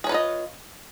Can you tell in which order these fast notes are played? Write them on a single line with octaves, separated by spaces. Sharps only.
G#4 C#5 B4 F4 D#5